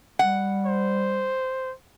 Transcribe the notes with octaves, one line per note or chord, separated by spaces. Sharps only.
G3 F#5
C5